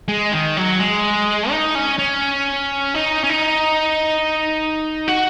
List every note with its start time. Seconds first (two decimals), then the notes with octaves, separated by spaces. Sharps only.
0.08 G#3
0.32 D#3
0.57 F#3
0.80 G#3
1.51 D#4
1.75 C#4
1.99 C#4
2.95 D#4
3.24 C#4
3.29 D#4
5.08 F#4